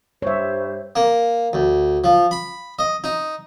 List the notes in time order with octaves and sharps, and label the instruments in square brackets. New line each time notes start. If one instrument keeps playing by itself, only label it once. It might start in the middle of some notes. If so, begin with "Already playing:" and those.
[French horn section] G2 G3 [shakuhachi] C5 [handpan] C#5 E5
[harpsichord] A#3
D2
F3
B5
D#5
D#4